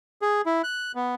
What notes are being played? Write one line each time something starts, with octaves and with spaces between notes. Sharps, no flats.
G#4
E4
F#6
B3